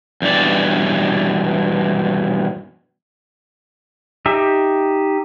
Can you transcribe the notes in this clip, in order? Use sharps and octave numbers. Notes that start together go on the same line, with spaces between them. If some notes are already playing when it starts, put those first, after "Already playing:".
E2 G2 B2 D5
D#4 G4 E5